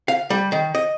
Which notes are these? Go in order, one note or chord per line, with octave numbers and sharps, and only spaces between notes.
F5
G3
D#3
D#5